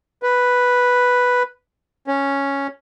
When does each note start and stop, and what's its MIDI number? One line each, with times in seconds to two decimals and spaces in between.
0.23 1.43 71
2.07 2.67 61